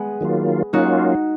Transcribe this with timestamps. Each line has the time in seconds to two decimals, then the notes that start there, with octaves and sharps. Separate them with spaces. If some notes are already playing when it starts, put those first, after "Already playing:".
Already playing: G#3 B3
0.21 D#3 F#3 A#3 F4
0.73 F#3 A#3 C#4 D#4 F4 F#4